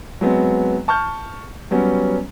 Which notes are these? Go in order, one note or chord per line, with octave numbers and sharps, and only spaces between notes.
F#3 G#3 B3 C4
A5 C#6 F6 G6
F#3 G3 B3 C#4